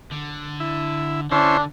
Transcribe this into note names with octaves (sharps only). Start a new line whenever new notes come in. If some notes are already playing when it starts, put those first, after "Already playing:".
D3
E4
D3 C#4 D4 E4 C5